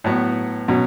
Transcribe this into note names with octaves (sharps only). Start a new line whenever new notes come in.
A2 F#3 B3
B2 F#3 C#4